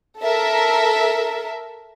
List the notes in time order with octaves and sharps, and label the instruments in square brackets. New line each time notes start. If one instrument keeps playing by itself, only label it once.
[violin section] A4 A#4 E5